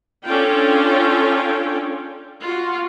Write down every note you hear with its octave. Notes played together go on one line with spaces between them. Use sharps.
C#4 D4 F4 A4 G5
F4 F#4